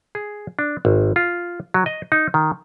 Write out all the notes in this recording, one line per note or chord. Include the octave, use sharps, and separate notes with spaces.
G#4
D4
G#1
F4
F#3
D#5
D#4
D#3